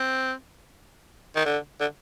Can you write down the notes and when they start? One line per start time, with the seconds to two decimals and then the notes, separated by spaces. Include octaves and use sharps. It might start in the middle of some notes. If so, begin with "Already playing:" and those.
Already playing: C4
1.36 D#3
1.46 D3
1.80 D3